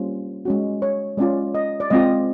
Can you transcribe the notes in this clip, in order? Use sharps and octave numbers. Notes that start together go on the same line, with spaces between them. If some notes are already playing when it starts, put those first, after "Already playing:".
Already playing: G3 A#3 C#4 F4 C5
G#3 C#4 F#4
C#5
G#3 C#4 F4 D5
D#5
D5
G#3 C4 F4 D#5